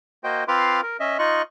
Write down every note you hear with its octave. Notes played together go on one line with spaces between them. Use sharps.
A#3 F#4 C5 D#5 G5
C4 F4 B4 F5 C6 D6
A#4
C#4 D#5 E5
D#4 F4 D#5 C#6 F#6